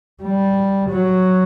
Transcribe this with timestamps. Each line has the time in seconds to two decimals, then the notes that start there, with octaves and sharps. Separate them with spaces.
0.23 G3
0.90 F#3